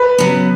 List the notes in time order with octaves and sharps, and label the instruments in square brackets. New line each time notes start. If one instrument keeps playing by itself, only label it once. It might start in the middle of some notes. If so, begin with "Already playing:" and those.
Already playing: [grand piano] B4
[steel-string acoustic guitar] C#3 F#3 B3